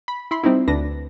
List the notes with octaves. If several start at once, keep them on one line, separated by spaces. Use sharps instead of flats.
B5
E4 B5 C6
G3 C4 D#4 E4
D2 D4 B4 A#6